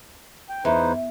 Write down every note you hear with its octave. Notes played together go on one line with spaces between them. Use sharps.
G5
E2 D#4 B4 C5